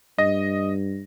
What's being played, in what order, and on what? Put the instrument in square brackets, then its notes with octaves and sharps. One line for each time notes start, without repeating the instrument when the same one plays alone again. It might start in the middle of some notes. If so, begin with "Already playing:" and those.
[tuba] G2 [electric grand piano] D#5 A#6